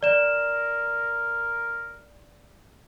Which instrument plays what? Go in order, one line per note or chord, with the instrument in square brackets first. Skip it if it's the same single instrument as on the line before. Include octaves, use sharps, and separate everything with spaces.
[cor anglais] A#4 [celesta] D5 E7